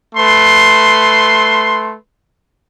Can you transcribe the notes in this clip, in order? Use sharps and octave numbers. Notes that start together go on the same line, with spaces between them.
A3 B4 C6